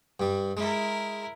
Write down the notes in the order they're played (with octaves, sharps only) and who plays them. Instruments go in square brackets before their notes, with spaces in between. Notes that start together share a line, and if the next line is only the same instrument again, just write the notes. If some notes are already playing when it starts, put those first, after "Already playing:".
[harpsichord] G2 G3
[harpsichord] G#3 [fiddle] E4 A#4